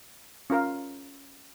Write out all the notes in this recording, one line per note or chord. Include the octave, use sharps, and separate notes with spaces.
C#4 F4 A#4 F5